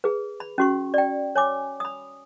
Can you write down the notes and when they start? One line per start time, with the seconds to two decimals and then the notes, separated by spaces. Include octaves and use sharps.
0.04 G#4 B4
0.40 B5
0.58 C#4 F#4 C#6
0.94 D5 G5
1.36 C#5 G#5 D6
1.80 B5 D#6